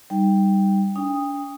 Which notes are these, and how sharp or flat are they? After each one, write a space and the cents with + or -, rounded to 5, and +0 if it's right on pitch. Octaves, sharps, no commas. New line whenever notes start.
G3 +0 D#4 +0 G5 +0
D4 -45 G5 +35 D#6 +0